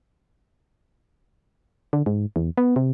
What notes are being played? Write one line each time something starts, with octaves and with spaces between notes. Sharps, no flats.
D3
G#2
E2
B3
C3